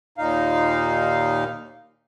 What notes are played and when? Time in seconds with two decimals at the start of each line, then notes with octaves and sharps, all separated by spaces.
0.18 D#2 A#2 D#4 F5